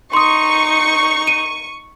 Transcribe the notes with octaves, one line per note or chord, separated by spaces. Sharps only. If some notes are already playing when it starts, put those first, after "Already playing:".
D#4 C6 C#6 D#6
D#7